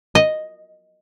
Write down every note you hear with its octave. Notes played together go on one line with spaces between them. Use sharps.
D#5